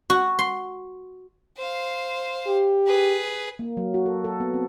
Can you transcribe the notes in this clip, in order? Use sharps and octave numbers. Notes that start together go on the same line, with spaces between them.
F#4
C6
C5 F5
G4
G#4 B4
A#3
F#3
F#4
A4
A4
B3
C4